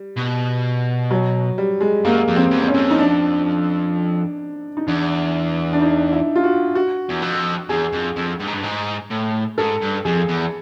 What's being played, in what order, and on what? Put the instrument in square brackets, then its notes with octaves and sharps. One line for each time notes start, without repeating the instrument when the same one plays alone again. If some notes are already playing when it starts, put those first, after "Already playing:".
Already playing: [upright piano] G3
[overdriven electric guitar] B2
[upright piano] F#3
G3
G#3
[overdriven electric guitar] F#2 [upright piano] A#3
[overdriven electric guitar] F2
[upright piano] C4
[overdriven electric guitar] E2
[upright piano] C4
C#4
[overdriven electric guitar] F2
[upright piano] D#4
D4
D#4
[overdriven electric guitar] E2 [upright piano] D4
[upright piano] D4
D#4
E4
F4
F#4
F#4
[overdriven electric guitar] E2
F2
[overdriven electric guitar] E2 [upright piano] G#4
[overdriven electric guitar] F2
F2
G2
G#2
G2
G#2
A2
[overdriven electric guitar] G#2 [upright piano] A4
[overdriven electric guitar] G2
[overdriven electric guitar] F2 [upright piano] G#4
[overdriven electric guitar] E2